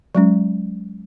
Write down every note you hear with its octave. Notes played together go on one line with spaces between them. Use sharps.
F#3 G#3 C#4